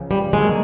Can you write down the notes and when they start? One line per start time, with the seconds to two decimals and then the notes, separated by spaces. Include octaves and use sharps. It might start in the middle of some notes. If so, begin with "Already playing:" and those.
Already playing: C#2 C#3 F3
0.11 G3
0.33 D3 F#3 G#3 A#3